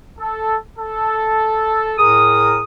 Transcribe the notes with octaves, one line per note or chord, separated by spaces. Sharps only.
A4
A4
A2 G#4 A#4 D#6